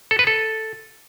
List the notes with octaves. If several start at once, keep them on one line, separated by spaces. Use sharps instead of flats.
A4
B4
A4